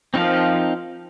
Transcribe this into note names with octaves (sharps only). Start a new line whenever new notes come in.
F3 C4 D#4 A#4 F5